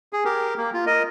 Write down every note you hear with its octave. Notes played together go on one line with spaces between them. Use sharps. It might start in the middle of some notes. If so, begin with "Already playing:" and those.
G#4
G4 A#4
A#3
F4
A#4 D#5